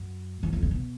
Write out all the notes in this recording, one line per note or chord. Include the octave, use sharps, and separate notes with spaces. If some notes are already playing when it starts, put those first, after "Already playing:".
Already playing: F#2
E2
F2
A#2
B2